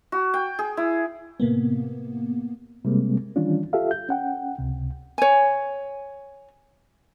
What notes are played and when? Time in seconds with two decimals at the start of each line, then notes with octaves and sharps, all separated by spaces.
0.12 F#4
0.34 G5
0.59 G#4
0.77 E4
1.40 A2 C3 A#3 B3
2.85 C3 G3 G#3 A#3 C4
3.36 D#3 E3 G3 C#4 D4 F4
3.73 F4 G4 A4 E5 F5
3.91 G6
4.09 C#4 F#5 G5
4.59 C#2 C3
5.18 C#5 G#5